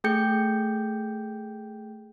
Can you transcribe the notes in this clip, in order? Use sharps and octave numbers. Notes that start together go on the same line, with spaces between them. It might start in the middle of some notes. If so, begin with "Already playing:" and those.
A3 G#4 G5 G6 C#7